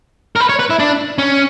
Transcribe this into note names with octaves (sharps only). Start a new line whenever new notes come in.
A#4
B4
C#5
B4
E4
D4
C#4